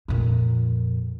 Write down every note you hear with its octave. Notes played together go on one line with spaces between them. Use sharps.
F2 A#2